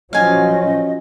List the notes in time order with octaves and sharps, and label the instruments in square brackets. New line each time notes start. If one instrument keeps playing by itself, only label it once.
[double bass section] F3 F#3 C#4 [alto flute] D#5 [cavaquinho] F5 G#5